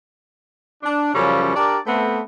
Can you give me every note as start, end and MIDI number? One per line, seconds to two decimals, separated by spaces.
0.83 1.12 62
1.14 1.53 42
1.14 1.53 49
1.14 1.53 53
1.14 1.53 55
1.14 1.53 61
1.14 1.53 69
1.54 1.78 62
1.54 1.78 67
1.54 1.78 70
1.54 1.78 74
1.86 2.20 57
1.86 2.20 59
1.86 2.20 60